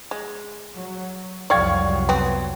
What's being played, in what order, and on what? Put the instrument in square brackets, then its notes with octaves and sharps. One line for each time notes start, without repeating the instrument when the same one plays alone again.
[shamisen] G#3
[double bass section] F#3
[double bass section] C2 F2 F#3 [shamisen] D5 G5 [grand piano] F5 C#6 G#6
[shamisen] B3 C4